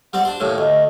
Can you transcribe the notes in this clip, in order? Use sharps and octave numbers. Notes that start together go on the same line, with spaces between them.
G3 C4 D5 F#5
D4 G4 C5
D#2 A2 C3 C#5
D2 D#5